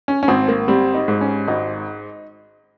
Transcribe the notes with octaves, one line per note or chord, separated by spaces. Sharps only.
C#4
C#4
G#1 C4
A#3
G3 C4
D#4
G#2
C#4
G#1 D#4